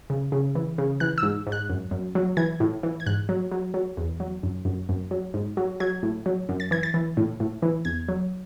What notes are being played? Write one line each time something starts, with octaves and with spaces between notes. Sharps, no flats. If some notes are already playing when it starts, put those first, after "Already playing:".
C#3
C#3
E3
C#3
E3 F#6
E6
G#2
G#2
F#6
F#2
F#2
F#3
E3 G#6
A2
E3
G#6
G#2 F#6
F#3
F#3
F#3
E2
F#3
F#2
F#2
F#2
F#3
G#2
F#3
F#3 G#6
A2
F#3
F#2
A6
E3 G#6
A6
E3
A2
A2
E3
E2 G#6
F#3